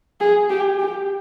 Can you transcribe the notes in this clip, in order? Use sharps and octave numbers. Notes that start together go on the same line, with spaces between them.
G#4
G4
G4